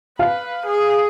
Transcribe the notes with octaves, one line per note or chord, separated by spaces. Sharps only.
B4 F5
G#4